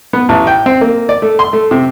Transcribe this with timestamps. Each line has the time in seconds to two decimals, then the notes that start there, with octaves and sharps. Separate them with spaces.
0.13 B3
0.29 A1
0.47 G5
0.66 C4
0.81 A#3
1.09 D5
1.22 A3
1.39 C6
1.53 A3
1.71 C3